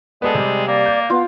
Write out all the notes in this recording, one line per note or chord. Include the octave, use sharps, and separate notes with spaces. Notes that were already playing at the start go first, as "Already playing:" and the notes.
G#3 B3 G4 A4 D5
C3 G3
A#3 D5
G6
B3 F4